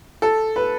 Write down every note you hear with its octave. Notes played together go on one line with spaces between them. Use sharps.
A4
B4